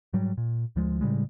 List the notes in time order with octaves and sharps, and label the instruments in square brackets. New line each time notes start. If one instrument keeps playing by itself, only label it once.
[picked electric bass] G#2 F#3 G3
A#2
D2 F3 G#3
A2 C#3 G3 G#3